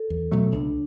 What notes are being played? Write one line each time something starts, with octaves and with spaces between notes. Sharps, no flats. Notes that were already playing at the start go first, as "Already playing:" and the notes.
Already playing: A4
E2
B2 F#3 A3
C#2 D4